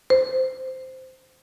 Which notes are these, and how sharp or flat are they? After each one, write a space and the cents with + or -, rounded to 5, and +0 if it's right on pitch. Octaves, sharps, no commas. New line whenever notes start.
C5 -10